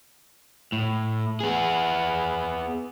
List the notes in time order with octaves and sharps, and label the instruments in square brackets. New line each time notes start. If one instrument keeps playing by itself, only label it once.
[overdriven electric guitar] A2
B3 G#4